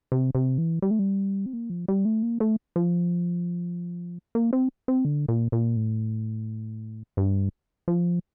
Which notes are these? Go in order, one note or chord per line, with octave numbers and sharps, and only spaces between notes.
C3
C3
E3
G3
A3
G3
C4
A#3
F3
G3
A3
A#3
A3
F3
A#3
C4
C4
D3
A#2
A#2
A2
G2
F3